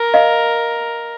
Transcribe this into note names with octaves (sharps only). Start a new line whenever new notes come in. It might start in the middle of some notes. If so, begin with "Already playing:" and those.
Already playing: A#4
D#5 F5